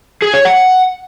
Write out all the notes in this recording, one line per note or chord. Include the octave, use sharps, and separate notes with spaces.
G#4
C#5
F#5